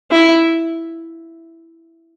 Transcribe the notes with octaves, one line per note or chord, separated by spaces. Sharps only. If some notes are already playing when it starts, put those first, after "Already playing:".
E4